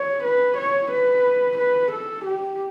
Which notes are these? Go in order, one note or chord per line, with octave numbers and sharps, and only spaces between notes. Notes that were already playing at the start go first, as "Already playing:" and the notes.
Already playing: C#5
B4
C#5
B4
B4
A4
G4